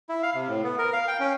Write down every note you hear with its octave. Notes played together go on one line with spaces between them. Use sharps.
E4
F5
C3
A2
B3
A#4
F5
G5
C#4